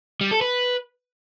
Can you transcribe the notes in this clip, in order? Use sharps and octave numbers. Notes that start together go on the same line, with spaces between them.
G3
A4
B4